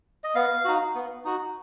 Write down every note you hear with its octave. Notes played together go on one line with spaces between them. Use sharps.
D#5
B3 F5
D#4 F#4
B3
D#4 F#4